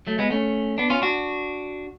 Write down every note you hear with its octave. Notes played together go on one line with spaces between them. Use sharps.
F#3 A3
G#3 B3
A3 C#4
B3 D4
C#4 F4
D4 F#4